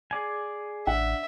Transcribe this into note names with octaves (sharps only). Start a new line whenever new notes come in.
G#4 D5 G#5
A1 D4 E5 F#5